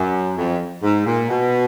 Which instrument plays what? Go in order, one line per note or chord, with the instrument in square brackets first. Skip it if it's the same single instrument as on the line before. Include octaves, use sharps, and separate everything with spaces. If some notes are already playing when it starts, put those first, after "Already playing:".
Already playing: [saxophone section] F#2
F2
G#2
A#2
B2